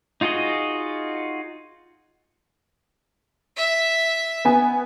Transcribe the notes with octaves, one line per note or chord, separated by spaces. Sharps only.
D#4 F4 F#4 G#4 D#5
E5
B3 G#5